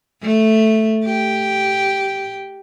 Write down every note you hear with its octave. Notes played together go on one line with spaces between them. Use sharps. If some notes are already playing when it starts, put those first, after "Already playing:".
A3
G4